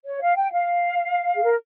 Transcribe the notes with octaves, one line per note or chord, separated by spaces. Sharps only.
C#5
F5
G5
F5
G#4
A#4